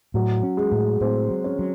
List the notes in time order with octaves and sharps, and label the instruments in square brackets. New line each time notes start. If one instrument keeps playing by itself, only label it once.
[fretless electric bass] A2 [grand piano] F#3
[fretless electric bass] C#4
[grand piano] G#3
[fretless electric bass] A2
[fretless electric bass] A2 [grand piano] C4
[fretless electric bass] F#3
[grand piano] C#4
[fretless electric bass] F#3